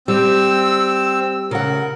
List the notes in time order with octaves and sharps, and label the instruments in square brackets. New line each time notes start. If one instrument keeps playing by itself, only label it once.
[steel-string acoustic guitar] G3 [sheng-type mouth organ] C4 E6
[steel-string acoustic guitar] C#3 F#5 [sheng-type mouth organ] A#4